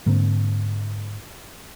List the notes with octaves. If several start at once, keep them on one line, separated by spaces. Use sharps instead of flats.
G#2 D3 A#3 C4